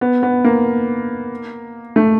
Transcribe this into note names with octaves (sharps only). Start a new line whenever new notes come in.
B3
B3
A#3
A3